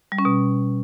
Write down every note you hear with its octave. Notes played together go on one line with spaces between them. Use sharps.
G3
C#4
B2